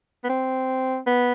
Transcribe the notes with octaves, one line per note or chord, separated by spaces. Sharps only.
B3
C4
B3